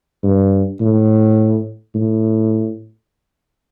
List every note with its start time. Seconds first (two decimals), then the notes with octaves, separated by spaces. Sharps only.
0.23 G2
0.81 A2
1.95 A2